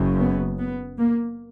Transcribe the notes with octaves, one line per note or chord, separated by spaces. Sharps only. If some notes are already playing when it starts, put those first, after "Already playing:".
Already playing: F#1 F#2 C#3
B3
B3
A#3